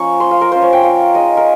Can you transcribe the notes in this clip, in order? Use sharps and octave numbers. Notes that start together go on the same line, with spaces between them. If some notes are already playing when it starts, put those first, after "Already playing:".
Already playing: F3 A#3 C#4 C#6
C6
F5
A#4
A#3 C#4 F4 C5
C#5
G5
F5
G#3 D#4 D#5
A#4